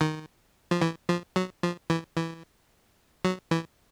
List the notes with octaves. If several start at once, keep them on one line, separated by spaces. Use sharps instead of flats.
D#3
F3
E3
F3
F#3
F3
E3
E3
F#3
E3